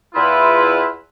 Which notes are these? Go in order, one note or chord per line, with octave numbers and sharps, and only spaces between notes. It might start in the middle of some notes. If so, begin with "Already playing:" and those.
E2 E4 F4 B4